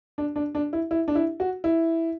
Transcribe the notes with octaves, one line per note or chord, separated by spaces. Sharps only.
D4
D4
D4
E4
E4
D4
E4
F#4
E4